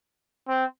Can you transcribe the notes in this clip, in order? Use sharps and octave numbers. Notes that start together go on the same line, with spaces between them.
C4